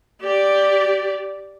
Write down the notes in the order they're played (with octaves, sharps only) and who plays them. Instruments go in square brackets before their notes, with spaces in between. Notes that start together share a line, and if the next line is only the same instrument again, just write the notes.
[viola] G4 D5